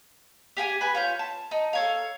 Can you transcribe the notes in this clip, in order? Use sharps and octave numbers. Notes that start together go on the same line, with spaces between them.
G4 G#4 F5 G#5
B4 G#5
F4 C#5 G6
A5
D#4
A4 C#5 F5